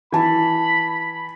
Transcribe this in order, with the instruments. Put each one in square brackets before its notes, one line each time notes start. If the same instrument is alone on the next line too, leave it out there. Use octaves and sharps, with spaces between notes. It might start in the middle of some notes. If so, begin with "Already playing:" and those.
[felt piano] E3 A5 [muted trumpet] B5